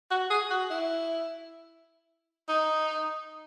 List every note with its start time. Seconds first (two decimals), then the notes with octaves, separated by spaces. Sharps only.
0.11 F#4
0.30 G#4
0.51 F#4
0.71 E4
2.49 D#4